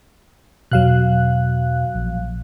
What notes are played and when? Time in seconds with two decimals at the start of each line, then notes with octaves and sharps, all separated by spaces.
0.72 E2 B2 F#3 F5 F#6
1.95 A#1